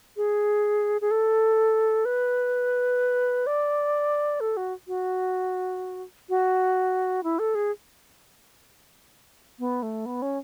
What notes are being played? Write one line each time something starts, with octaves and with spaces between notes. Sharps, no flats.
G#4
G#4
A4
B4
D5
A4
F#4
F#4
F#4
E4
A4
G#4
B3
A3
B3
C#4